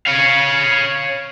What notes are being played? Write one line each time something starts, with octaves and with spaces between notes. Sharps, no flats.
C#5 F5